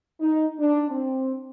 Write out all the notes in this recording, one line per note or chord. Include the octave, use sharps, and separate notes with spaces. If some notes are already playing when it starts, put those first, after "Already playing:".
D#4
D4
C4